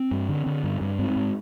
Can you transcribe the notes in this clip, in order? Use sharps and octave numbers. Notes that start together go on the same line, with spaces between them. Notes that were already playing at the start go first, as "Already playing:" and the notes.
Already playing: C4
G2
D3
D3
G2
G2
G#2 C4
G#2